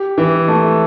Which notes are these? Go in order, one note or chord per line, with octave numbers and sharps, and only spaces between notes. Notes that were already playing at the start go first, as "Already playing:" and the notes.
Already playing: G4
E3
A3